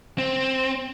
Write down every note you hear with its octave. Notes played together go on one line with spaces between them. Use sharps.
C4